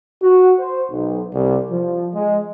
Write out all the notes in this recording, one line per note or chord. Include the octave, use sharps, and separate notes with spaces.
F#4
C5
B1
C2
F3
G#3